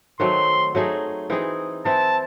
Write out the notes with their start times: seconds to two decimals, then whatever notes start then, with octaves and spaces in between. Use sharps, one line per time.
0.20 D#3 F#3 A3 C4 C6
0.75 F#3 A3 D#4 G#4
1.30 E3 C4 D#4 G#4
1.85 E3 C4 E4 A5